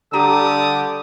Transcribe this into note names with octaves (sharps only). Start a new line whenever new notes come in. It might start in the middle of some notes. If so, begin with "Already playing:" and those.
D3 G3 D4 G4 A4 A#5 D6 D#6